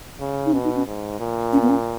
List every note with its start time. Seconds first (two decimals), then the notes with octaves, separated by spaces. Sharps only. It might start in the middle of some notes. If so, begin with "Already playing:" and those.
0.20 C#3
0.46 D#4
0.53 B2 C#4
0.64 D#4
0.76 C#4
0.87 G#2
1.20 A#2
1.53 C#4
1.62 B3
1.69 C#4